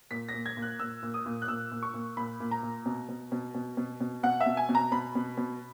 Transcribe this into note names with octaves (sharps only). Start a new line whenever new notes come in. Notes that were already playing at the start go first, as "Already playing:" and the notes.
A#2 B6
A#6
A#2
G#6
A#2
F#6
A#2 E6
A#2
D#6
A#2
F#6
A#2 E6
A#2
C#6
A#2
A#2 B5
A#2
A#5
A#2
B2
B2
B2
B2
B2
B2
B2 F#5
E5
B2
G#5
B2
A#5
B2 B5
B2
B2